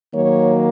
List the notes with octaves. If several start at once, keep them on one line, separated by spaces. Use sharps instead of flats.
D#3 F#3 A#3 C#5